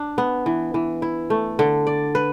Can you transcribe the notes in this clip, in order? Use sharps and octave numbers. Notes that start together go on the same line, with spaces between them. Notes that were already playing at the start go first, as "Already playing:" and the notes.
Already playing: D4
B3
E3
E3
E4
A3
D3
D5
B4